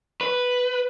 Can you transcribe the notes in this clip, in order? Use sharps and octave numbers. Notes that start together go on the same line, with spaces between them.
B4